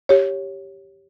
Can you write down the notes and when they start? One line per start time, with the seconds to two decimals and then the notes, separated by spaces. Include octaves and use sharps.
0.09 G4 C#5